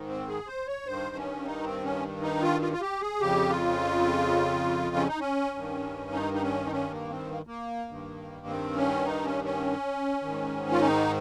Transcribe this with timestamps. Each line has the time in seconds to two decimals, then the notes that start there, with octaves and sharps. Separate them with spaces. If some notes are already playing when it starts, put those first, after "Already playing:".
Already playing: G#2 D#3
0.08 C4
0.28 G#4
0.47 C5
0.67 C#5
0.86 G2 D#3 C5
1.16 C#4
1.45 D#4
1.64 C4
1.84 C#4
2.22 D#4
2.42 F4
2.62 F4
2.73 F4
2.81 G4
3.01 G#4
3.20 F2 C#3 G4
3.49 F4
4.96 C#4
5.08 D#4
5.20 C#4
5.54 G2 D#3
6.13 D#4
6.34 D#4
6.42 C#4
6.66 D#4
6.72 C#4
6.91 A#3
7.10 C4
7.30 A#3
7.47 A#3
7.88 G2 D#3
8.47 C4
8.76 C#4
9.05 D#4
9.25 C#4
9.45 C#4
10.22 G#2 D#3
10.72 F4
10.81 D#4